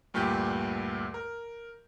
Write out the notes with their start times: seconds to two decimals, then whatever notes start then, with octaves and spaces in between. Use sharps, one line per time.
0.14 D2 G2 A#2 G4 G6
1.14 A#4